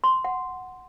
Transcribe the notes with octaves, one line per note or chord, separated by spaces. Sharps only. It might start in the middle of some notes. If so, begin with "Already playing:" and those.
C6
F#5